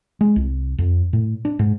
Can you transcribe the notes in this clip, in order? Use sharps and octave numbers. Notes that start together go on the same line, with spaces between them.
G#3
C2
F2
A2
D4
G#2